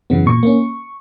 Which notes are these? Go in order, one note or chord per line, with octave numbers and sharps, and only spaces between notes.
F#2 C#3 E3 B3
A#2 C#6
A#3 C#4